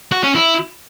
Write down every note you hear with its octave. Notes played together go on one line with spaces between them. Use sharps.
F#4
C#4
E4